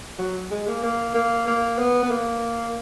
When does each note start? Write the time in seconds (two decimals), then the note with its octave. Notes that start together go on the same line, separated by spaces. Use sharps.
0.19 F#3
0.51 G#3
0.67 A#3
0.83 A#3
1.15 A#3
1.48 A#3
1.79 B3
2.03 B3
2.11 A#3